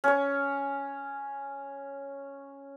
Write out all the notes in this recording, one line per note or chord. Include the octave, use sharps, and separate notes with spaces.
C#4 C#5